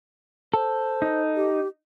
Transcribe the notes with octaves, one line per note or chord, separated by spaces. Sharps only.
A4 C5
D#4
G4